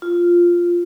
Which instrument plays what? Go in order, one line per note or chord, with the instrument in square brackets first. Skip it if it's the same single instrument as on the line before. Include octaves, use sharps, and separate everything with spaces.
[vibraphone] F4